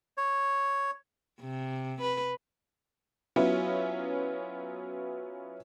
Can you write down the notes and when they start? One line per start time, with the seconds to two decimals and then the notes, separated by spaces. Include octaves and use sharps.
0.17 C#5
1.41 C3
2.02 B4
3.36 F#3 B3 C#4 E4 F4